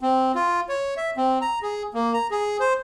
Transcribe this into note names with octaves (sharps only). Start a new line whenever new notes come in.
C4
F4
C#5
E5
C4
A#5
G#4
A#3
A#5
G#4
C5